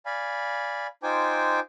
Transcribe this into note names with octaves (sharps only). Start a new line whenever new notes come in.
D5 F5 G#5 B5
D#4 F4 C5 G5 G#5 D6